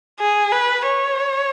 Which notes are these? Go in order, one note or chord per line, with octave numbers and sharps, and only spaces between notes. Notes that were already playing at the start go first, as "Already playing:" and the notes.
G#4
B4
C#5